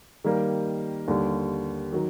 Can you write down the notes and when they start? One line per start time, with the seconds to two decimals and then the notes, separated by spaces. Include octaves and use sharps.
0.24 D#3 G3 A#3
1.08 D#2 D3 G3
1.92 D#3 F#3